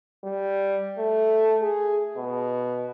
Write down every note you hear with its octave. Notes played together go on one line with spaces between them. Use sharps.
G3
A3
G#4
B2